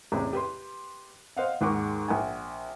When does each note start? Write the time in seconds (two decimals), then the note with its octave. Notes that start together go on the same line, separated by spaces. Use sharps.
0.12 A1 E2 C3
0.33 G4 B4 C6
1.37 C5 D#5 F5 F#5
1.61 D#2 G#2 G#3 F#5 C#6 D6
2.08 A#1 F#5 G#5